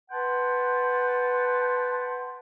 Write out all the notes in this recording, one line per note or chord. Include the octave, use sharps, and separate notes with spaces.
B4 F#5 G5 A5 C6